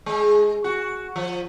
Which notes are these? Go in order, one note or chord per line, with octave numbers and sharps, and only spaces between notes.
G#3
F#4
F3